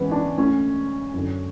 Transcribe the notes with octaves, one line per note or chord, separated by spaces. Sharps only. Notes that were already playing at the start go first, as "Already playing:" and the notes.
Already playing: G#2 E3 B3 C#4
D4
D2 D3 C#4
F#2 D3